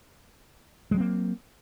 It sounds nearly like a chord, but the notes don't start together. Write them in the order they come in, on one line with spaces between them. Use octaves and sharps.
G#3 F#3 C4 A#3